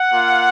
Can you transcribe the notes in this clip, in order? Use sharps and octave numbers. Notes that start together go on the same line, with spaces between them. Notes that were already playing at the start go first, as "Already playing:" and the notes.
Already playing: F#5
A#3 F4